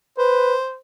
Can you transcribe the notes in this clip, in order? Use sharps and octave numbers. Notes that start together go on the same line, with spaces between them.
B4 C5